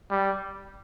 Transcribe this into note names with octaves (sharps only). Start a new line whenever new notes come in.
G3